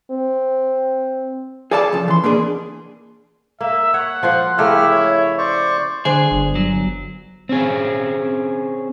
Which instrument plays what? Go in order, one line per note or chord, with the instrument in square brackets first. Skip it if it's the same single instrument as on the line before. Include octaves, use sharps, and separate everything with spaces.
[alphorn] C4
[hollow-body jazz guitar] G#4 A4 D5 F5 G#5 A5
C#3 F3
E3 C6
B2 A#3 D4 G#4
[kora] A#3 [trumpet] E5
[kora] C#5 [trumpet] F#5
[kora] F3 F4 C5
[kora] C#3 A3 A#4 [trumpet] E4 [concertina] G4 F6
[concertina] C#5 E5
C5 D5 C#6
[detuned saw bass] D3 [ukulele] D4 C5 [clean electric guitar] G#4
[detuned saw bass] G1
[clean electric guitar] F#3
[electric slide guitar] C4 C#4 G#4